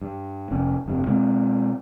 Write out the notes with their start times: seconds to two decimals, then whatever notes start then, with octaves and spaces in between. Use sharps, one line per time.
0.01 G2
0.51 F1 C#4
0.86 F1 G2 C3
1.07 B2 G#3 C4